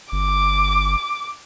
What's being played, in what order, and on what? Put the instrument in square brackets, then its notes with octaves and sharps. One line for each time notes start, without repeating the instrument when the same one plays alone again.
[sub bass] G1 [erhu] D6